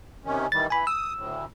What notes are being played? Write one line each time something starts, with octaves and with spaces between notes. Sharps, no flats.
C3 D#3 C#4
D#3 E3 G3 A6
E3 G#5 B5
D#6 E6
D2 A2